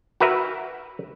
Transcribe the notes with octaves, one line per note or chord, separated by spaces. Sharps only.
F#4 A#4 B4 E5